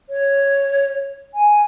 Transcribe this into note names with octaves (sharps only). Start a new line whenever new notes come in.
C#5
G#5